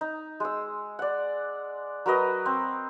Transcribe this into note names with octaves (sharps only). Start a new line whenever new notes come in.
D#4
G#3 E6
D5 F#5
F#3 A#4 B4 D#5
C4